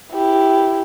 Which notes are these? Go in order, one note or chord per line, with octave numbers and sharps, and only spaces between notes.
E4 G4